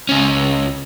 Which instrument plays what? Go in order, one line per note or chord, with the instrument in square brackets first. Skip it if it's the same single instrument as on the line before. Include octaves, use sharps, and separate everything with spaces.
[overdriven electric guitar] C#2 C#4